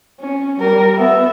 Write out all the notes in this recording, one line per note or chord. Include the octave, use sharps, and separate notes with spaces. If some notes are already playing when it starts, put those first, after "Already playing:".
C#4
G3 A#4
B3 E5